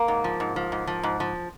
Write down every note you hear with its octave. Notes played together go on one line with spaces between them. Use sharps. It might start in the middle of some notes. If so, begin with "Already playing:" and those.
Already playing: A#3
G#2
F3
G#2
F3
G#2
F3
G#2
F3